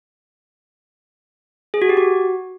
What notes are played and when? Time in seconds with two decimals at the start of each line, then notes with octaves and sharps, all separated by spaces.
1.74 G#4
1.82 F#4
1.89 G4
1.97 F#4